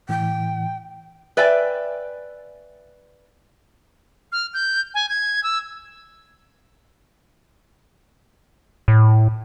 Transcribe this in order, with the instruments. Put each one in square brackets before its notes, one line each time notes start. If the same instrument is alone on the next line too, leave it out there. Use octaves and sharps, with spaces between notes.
[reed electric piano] A2 E3 [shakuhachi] G5
[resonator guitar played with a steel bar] B4 D5 E5 G5 G#5
[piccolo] F6
G6
G#5
G#6
E6
[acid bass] A2